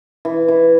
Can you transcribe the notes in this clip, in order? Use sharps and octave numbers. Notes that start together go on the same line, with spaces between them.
E3
E3